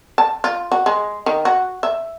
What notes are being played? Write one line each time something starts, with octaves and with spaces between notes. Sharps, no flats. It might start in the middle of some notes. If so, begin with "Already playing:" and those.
A5
F4
F#4
G#3
D#3
F#4
E5